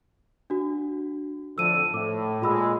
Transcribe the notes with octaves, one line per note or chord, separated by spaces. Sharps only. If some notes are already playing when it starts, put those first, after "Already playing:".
D4 F#4
F2 A2 D3 E6 D#7
A2 D6
A#2 G#3 F4 B5 E6